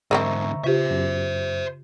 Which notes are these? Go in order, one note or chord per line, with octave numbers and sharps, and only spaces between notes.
G#2 D3 C4 A#4 D#5 E5 A#5 C#6
C#3 F4 G4 C5 E5
F#2